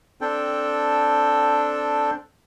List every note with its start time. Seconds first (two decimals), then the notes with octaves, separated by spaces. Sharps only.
0.21 C4 D4 A4 G5